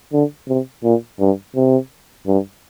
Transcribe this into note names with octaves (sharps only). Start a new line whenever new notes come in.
D3
C3
A#2
G2
C3
G2